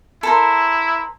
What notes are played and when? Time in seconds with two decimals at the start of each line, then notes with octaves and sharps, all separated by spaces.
0.23 E4 A4 A#4 C5